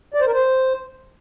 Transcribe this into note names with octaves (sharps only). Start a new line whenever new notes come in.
D5
C5
A#4
C5